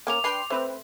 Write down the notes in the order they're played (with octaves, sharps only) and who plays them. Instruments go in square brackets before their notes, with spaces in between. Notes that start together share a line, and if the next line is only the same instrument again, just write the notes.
[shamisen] A#3 C#4 A#4 [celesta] D6 F7
[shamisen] D4 B4 [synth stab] G5 C6 C7
[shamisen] A3 [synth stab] C4 B4 C5